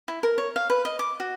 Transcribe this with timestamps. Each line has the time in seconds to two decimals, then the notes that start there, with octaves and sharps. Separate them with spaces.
0.08 E4
0.23 A#4
0.38 C#5
0.56 F5
0.70 B4
0.85 D#5
0.99 D6
1.20 F#4